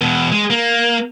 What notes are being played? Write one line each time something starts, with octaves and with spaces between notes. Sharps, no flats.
E2 B2
G#3
A#3